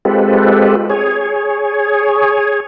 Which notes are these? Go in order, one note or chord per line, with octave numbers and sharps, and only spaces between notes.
G#3 C4 F4 G4 A4 B4
G#4 C#5